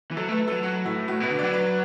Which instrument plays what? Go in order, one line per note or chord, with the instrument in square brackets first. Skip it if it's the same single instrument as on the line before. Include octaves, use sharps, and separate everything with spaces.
[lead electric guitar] E3
[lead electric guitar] F#3 [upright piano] A4
[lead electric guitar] A3 [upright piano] B4
[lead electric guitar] F#3 [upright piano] A4
[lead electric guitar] F#3 [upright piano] F#4
[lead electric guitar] A2 [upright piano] E4
[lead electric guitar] A2 [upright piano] F#4
[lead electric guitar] B2 [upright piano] B4
[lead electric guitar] D3
[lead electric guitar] F#3 [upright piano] D5
[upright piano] B4